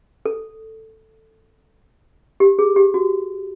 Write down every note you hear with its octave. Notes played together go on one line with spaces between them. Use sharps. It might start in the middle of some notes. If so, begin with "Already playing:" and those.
A4
G4
G#4
G4
F#4